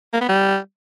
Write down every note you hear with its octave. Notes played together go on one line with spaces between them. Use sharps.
A#3
B3
G3